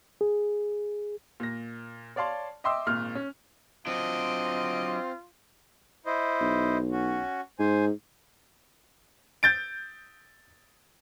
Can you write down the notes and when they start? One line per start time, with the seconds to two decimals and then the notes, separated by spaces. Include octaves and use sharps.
0.21 G#4
1.40 A#2 A#6
2.16 C#5 D5 F5 A5 C6
2.64 D#5 E5 G5 C6 D6 E6
2.86 G#1 A#2 F6
3.15 C#4
3.87 F#3 C4 D4 F4 D#5
6.06 E4 C5 D#5
6.41 B1
6.92 C#4 F#4
7.59 G#2 C5 G#5
9.43 G6 A6 D7